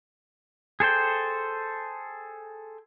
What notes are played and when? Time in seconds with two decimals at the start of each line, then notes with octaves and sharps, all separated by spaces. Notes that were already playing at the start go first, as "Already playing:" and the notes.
0.80 G#4 A4 C5 G5